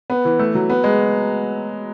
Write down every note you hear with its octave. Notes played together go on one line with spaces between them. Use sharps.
B3
E3
A3
F#3
B3
G#3